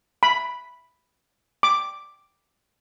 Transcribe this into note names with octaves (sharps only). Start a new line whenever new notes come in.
B5
D6